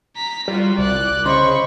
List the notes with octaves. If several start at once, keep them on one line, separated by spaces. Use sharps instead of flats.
A#5 B6
G3 F4 F#4
C2 D5 F#6
C#3 C5 D#5 B5 C#6